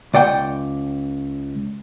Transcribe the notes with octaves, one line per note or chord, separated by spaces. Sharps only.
C#2 D5 F#5 G5